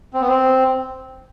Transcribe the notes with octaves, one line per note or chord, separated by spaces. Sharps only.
C4
B3
C4